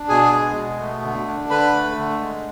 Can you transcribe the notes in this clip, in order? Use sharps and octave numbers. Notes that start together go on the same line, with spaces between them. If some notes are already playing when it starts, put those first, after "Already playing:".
Already playing: D4
B2 G#4 G#5
G#3
B2
A3
D3
D4
D3 B4 B5
A3
D3
G#3